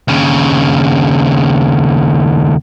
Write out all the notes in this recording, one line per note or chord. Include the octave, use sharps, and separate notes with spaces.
D#2 C#3